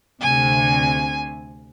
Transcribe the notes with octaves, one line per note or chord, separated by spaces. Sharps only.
D2 C3 G#5